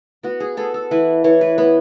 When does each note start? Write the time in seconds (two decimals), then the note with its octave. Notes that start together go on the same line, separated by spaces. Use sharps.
0.23 B3 F#4
0.40 G#4
0.57 B3 A4
0.74 A4
0.91 E3 B4
1.24 E3 C#5
1.41 B4
1.58 B3 B4